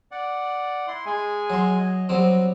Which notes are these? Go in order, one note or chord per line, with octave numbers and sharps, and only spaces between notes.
D5 F#5
E4 C6
G#3 G#4 G#5
F#3 C6
D#5
F#3 G3 C4